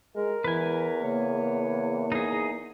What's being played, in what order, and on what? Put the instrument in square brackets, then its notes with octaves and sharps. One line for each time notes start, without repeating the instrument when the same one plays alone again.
[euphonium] G#3 [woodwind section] A#4
[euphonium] E2 [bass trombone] E3 [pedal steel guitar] B4 G#5
[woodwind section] C#3 C#5 [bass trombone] A#3
[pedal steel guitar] D#4 G#4